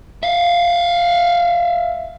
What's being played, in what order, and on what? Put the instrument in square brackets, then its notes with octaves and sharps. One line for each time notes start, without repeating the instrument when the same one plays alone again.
[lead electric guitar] E5 F5